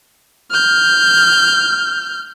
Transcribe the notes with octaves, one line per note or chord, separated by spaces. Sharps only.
F6 G6